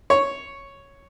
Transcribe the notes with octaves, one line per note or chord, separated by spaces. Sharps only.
C#5